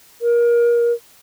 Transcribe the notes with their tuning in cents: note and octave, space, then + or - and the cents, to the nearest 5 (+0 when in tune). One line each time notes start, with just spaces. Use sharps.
A#4 +25